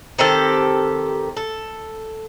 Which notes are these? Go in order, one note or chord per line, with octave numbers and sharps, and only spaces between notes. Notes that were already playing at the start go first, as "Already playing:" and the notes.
D#3 C4 G4 A4
A4